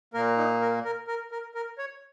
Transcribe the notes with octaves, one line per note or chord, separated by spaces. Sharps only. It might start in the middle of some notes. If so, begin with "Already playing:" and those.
A#2 A#3 A#4
D#4
A#4
A#4
A#4
A#4
A#4
C#5